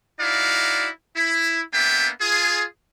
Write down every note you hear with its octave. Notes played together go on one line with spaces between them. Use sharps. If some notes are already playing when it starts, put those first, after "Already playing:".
D#4 E4 F#4 D5 F5
E4
A#3 B3 D4 E5 G5
F4 G#4